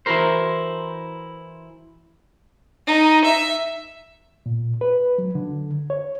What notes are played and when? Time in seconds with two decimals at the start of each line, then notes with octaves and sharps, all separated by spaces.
0.06 E3 E4 F#4 A#4 C5
2.87 D#4
3.25 E5
4.46 A#2
4.81 B4
5.18 F#3
5.35 D3
5.90 C#5